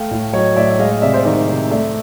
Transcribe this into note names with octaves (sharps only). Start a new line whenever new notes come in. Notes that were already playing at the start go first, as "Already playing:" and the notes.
Already playing: A3 F5 G5
A2
F#3 C#5 D#5
A2 D5 E5
E5
G#3 D#5 F5
D#5 F5
C3 D5 E5
C5 D5
D#3 D5 E5
C3
A3 D5 E5